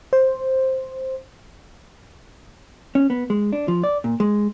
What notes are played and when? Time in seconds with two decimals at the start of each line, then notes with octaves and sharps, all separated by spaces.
0.13 C5
2.95 C#4
3.10 B3
3.30 G#3
3.53 D4
3.68 F3
3.84 D5
4.04 A#2
4.20 G#3